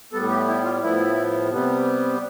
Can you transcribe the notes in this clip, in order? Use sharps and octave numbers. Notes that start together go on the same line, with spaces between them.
A2 G3 B3 A4
G4
E4
F4
A2 F3 B3 E4
C3 G3 B3